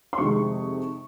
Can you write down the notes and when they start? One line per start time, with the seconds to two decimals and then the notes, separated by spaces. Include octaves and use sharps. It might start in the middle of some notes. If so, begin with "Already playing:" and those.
0.13 C6
0.18 F2 C3 D#3 G#3 C#6